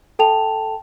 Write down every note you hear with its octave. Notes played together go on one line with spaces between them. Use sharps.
A4 G5 A5 F7